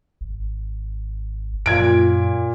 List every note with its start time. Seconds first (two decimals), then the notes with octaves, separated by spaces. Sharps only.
0.21 G#1
1.66 F#2 A#2 G#6 D7